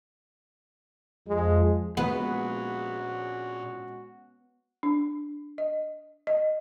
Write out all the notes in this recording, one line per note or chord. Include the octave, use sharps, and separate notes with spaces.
F2 F3 G#3
A#2 F3 G#3 B3 C#4 F#4 B4
D4
D#5
D#5